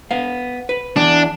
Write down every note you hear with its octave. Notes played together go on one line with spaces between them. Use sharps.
B3 F5
B4
E2 D4